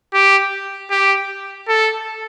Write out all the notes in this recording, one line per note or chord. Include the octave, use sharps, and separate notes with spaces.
G4
G4
A4